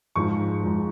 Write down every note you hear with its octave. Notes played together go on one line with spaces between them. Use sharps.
G#2 F3 G#3 C#6
G#2 F3 G#3